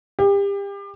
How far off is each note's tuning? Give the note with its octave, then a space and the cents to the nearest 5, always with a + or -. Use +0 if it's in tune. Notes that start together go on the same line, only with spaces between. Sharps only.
G4 +30